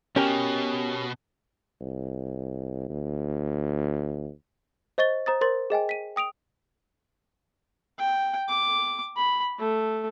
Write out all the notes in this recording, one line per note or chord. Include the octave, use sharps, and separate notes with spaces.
B2 C#4 G4 A#4
C2
D2
C5 D#5 C#6 A6 G7
C5 A#5 D#6 A6
A#4 C5 C6 A6
G#4 D#5 G5 G#5
B6 D#7
G5 D#6 D7 F7
G5
D6
B5
A3